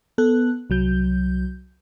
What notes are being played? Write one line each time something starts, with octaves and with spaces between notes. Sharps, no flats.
B3 A4 F#6
C2 F#3 G6